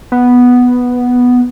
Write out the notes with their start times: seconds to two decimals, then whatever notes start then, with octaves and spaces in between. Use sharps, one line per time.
0.12 B3